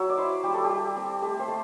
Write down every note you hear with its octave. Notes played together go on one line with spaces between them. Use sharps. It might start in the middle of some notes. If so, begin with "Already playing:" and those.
Already playing: F#3 E5
D5
E4 C5
G3 G4
A4
G4
G3
C4
A3 G4
C5
A3